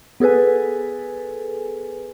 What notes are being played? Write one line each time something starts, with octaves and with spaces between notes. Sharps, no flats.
B3 G#4 A4 B4 G#5